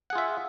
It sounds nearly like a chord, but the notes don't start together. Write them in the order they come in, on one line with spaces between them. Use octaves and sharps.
F#5 G#4 F4 E5